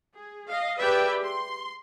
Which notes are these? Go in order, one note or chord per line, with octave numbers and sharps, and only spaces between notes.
G#4
D#5 F5
G4 G#4 B4 D5 E5 G5
C6